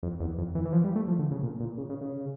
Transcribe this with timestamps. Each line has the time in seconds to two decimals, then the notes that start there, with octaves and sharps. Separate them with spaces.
0.03 F2
0.20 E2
0.38 F2
0.55 E3
0.65 E3
0.73 F3
0.84 G3
0.96 A3
1.08 F3
1.19 D3
1.31 C#3
1.43 A#2
1.60 A#2
1.78 C#3
1.89 C#3
2.01 C#3